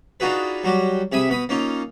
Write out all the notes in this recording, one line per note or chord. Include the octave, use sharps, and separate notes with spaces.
D4 D#4 F4 F#4 G#4 B4
F#3 G3 F#4 G4
C3 G#4 E5 B5 D#6
B2 B5 D#6
A#3 C#4 D#4 F4